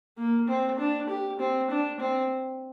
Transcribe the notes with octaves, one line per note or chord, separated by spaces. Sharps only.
A#3
C4
D4
G4
C4
D4
C4